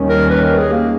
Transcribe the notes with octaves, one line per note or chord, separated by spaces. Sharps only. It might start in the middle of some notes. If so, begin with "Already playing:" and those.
Already playing: D#2 D#3 G3 C#4
A#4
B4
A#4
G#4
A#3